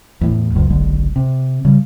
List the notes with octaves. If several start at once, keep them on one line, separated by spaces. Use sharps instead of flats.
E2 A2
D1 C#2 F#2
F#1 B1 D3 G#3
C3
C#3 G3